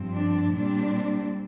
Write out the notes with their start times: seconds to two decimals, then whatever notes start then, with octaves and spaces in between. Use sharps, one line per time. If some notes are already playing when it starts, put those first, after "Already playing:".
Already playing: G2 F3 C4
0.13 D4
0.51 A#2 G3 C4 D4